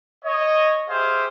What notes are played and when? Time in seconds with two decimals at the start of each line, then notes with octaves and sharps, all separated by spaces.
0.25 C#5 D#5
0.89 G4 G#4 C5 E5 F5